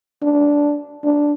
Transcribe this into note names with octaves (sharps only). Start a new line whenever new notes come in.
D4
D4